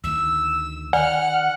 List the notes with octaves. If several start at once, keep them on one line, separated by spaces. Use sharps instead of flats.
D2 D#3 E6
D#3 D5 F#5 G#5 F6